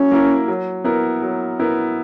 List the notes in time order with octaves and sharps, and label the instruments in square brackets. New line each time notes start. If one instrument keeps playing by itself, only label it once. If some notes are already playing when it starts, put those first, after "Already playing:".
Already playing: [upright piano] F#3 A#3 E4 [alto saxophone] C#4
[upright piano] A#3 E4 A#4
F#3
B3 E4 A#4
F#3
B3 E4 A#4